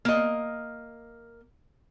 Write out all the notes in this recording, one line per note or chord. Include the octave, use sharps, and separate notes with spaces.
A#3 D#5